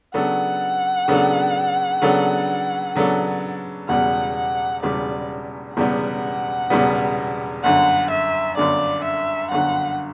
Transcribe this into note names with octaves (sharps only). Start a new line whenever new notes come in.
C#3 F#3 B3 D4 A4 F#5
C#3 F#3 B3 D4 A4
C#3 F#3 B3 D4 A4
C#3 F#3 B3 D4 A4
E1 E2 C#3 G3 B3 F#5
F#5
E1 E2 C#3 G3 B3 D5
E1 E2 C#3 G3 B3 F#5
E1 E2 C#3 G3 B3
G1 F#2 D3 F#5
E5
G1 F#2 D3 D5
E5
G1 F#2 D3 F#5